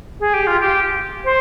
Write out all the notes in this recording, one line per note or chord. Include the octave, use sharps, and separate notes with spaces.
G#4
G4
F4
G4
C5